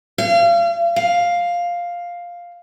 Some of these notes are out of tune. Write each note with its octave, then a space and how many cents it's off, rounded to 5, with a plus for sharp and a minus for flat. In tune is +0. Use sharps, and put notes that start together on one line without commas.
F5 -35
F5 +5